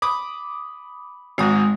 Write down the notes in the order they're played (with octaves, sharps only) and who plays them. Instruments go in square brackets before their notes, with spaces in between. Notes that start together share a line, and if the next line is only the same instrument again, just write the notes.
[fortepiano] B5 D6 D#6
[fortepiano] G#1 G#2 F#4 [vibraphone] G#3 D#6